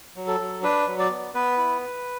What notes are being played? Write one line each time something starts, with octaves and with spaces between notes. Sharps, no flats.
F#3
A4
F#3
D4 B4
F#3
D5
B3
B3 B4
E4